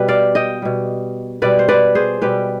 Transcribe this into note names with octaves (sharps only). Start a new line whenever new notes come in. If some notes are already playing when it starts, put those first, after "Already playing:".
Already playing: B2 G3 B4
D5 F5
D#5 G5
B2 G3
B2 G3 B4 D5
C5
B4 D5
G#4 C5
B2 G3 G4 B4